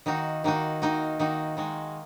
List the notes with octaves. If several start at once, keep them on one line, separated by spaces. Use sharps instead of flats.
D#3 A#3 D#4 F#4
D#3 A#3 D#4 F#4
D#3 A#3 D#4 F#4
D#3 A#3 D#4 F#4
D#3 G#3 F#4